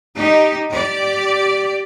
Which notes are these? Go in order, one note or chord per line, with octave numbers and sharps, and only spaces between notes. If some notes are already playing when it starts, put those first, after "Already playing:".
D#4 G4
G4 D5